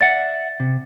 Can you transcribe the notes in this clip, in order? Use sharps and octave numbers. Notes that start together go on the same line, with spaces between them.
D5 E5 F#5 A6
C3